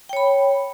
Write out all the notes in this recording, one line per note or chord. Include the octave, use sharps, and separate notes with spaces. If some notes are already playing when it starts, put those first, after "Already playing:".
C#5 G5 B5